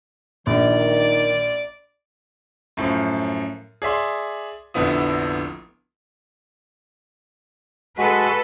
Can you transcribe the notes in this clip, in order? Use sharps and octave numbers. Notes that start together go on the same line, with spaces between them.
A#1 D#3 D5
F#2 A2 F3
G#4 D5 E5 C6
F1 A#1 D3 B3 E4 D#6
G#3 F#4 A4 B4